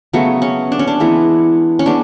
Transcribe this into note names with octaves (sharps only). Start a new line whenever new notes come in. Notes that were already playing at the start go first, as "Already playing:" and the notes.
C#3 F#3 A3 B3
C#4
D4
C#4
D4
E3 G#3 B3
C#4
G#3 B3 D4